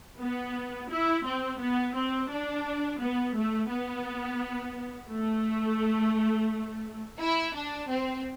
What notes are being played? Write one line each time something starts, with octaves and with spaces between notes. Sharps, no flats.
B3
E4
C4
B3
C4
D4
B3
A3
B3
A3
E4
D4
C4